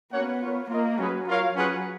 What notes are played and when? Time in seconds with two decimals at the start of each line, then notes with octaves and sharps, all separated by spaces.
0.13 A#3 B3 C#4 F#4 C#5 F#5
0.41 F4 A#4 C#5
0.70 A#3 F4 A#4 D#5
0.98 F#3 C#4 G#4 B4
1.28 F4 A#4 C#5 F5
1.55 F#3 C#4 F4 G#4 B4 F#5